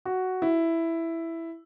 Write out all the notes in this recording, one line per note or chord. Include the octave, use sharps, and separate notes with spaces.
F#4
E4